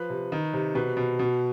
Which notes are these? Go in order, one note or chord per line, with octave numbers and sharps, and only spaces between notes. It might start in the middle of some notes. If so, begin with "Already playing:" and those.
Already playing: F3 B4
C3
D#3
C3
B2 B4
B2
B2